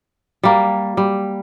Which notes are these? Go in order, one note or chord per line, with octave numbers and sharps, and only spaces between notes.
G3 A#3
G3